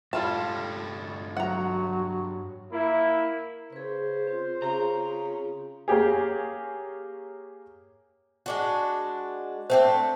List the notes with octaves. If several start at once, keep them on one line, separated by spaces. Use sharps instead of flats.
G2 G3 F4 A4 C#5 A5
F#3 F#5 A#5
A#3 E4
C#3 G#4 B4 C5
C4 F4
C#3 A#5
A#3 C#4 G4 G#4
G#3 D4 F#4
A3 C4 D4 C5